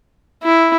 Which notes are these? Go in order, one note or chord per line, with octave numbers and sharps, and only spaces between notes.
E4